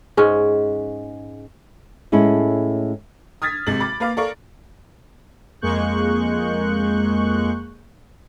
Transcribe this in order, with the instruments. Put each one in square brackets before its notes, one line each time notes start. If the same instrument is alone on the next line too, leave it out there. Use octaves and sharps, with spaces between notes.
[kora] G#2 G#3 C#4
[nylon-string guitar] A2 G#3 C#4 E4
[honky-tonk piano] D#6 F6 G#6 A6 B6
G#1 C3 G#3 A6 F#7
B5 D6 A6
A#3 B4 F5 D6
A4 A#4 D5 F5 C#6
[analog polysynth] F2 G#3 A#3 C#6 F#6 G6